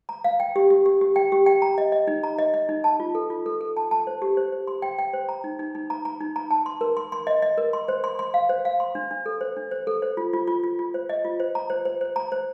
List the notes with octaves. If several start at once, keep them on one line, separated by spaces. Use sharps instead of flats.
A#5
F5
G5
G4
G4
G4
G4
G5
G4
G5
A#5
D#5
D#5
D#4
A#5
D#5
D#5
D#4
A5
F4
A4
F4
A4
A4
A5
A5
C5
G4
C5
C5
C6
G5
G5
C5
A#5
D#4
D#4
D#4
A#5
A#5
D#4
A#5
A5
C6
A#4
C6
C6
D#5
D#5
A#4
C6
C5
C6
C6
F5
C5
F5
C6
D4
D4
A4
C5
D4
C5
A4
C5
F4
F4
F4
F4
F4
C5
D#5
F4
C5
A#5
C5
C5
C5
A#5
C5